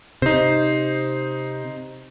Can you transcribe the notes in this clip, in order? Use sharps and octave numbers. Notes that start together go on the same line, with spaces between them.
C3 D#4 C5